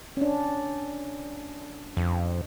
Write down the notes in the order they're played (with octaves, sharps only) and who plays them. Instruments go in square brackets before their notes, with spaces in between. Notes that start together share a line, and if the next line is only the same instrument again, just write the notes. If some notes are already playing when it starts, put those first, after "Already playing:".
[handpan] C#4 D4
[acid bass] F2